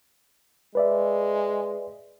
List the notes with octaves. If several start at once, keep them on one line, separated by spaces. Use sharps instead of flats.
G#3 B4 D5 E5